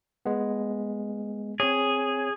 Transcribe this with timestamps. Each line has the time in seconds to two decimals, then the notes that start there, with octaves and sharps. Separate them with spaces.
0.26 G#3 B3
1.60 C4 G#4 C#5